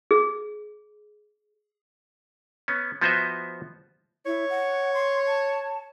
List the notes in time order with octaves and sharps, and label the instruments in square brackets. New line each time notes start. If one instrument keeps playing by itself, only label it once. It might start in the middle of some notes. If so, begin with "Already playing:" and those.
[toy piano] G#4
[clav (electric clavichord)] B3 C#4
F3 B3 F#4 C5 D#5 E5
[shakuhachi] E4 [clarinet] C#5
[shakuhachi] F#5
C6
A5